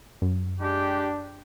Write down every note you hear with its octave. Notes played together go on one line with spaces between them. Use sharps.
F#2
G#3 D4 G4